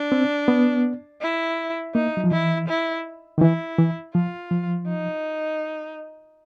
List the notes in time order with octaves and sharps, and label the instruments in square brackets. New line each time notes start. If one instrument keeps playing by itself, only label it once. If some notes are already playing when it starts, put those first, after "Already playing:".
Already playing: [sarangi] D4
[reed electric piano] C4
B3
[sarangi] E4
[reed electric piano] A#3 [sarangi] D#4
[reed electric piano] F#3
F3
[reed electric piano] E3 [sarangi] E4
[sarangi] E4
[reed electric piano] D#3
[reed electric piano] E3 [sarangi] E4
[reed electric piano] E3
[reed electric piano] F3 [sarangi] F4
[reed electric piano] F3
[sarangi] D#4